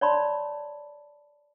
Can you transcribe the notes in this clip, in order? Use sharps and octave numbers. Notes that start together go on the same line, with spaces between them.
C#5 D5 A5 B5 C6